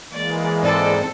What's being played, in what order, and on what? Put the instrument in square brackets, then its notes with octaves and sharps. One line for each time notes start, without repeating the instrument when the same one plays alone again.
[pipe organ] E3 G#3 A#3 [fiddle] D5
[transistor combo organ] G#2 C4 [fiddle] A4 C5 [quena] D5